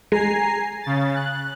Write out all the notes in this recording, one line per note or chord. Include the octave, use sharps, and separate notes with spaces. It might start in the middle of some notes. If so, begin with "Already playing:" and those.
G#3 G#5 A#5 C7
C#3 A6
F#6